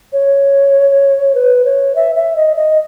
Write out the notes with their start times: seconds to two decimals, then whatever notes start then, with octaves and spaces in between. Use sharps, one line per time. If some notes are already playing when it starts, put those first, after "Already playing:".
0.13 C#5
1.35 B4
1.65 C#5
1.96 E5
2.16 E5
2.36 D#5
2.56 D#5